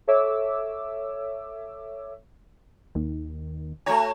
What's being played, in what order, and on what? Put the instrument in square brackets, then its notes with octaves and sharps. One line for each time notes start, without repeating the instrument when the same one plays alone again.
[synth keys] A4 C#5 E5 D6 E6
[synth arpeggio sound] D#2 D#3
[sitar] A3 F#4 C#5 [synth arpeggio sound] G#5 A#5